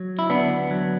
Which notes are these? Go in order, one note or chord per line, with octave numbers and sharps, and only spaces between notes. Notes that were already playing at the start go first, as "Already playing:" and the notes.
Already playing: F#3
E4
D2 B3 D4
F#3